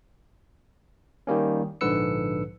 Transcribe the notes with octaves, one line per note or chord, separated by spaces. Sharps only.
D#3 G3 A#3 C#4
A#1 G#2 D3 B4 E6 C#7